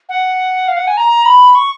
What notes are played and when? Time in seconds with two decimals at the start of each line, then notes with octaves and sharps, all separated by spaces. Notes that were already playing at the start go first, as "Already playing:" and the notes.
0.09 F#5
0.68 F5
0.76 F#5
0.87 G#5
0.97 A#5
1.25 B5
1.55 C#6